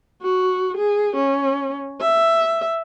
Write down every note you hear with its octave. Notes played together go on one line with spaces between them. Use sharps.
F#4
G#4
C#4
E5